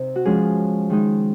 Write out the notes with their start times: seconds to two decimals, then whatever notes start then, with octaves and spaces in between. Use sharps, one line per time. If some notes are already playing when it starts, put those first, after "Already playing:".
Already playing: C3 C4 D#4
0.16 F#4
0.25 F3 G#3 C#4 G#4
0.90 D#3 G#3 D#4